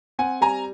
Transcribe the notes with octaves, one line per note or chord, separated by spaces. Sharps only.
C4 F#5 G#5
G3 G#5 A#5